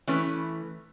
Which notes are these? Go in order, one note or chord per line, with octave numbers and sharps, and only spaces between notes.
E3 A3 C#4 B4